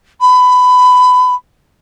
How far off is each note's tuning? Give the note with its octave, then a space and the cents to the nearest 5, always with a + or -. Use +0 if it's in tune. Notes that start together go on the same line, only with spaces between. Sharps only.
B5 +20